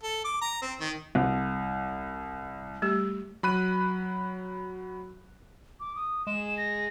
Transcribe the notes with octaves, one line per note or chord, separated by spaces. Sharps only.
A4
D6
A#5
C4
D#3
C2
G3 A3 G4
F#3 B5 F#6 D#7
D6
D#6
G#3 E7
A#6